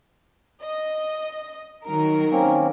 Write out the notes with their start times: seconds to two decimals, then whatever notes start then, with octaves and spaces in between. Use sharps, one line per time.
0.63 D#5
1.86 D#3 F#3 A#4
2.32 A#3 C4 C#4